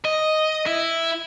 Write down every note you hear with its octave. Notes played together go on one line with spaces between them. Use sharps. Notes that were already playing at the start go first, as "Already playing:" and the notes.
D#5
E4